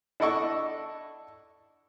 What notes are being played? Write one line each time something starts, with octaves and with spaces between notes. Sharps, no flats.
D4 E4 A4 D#5 F#5 C#6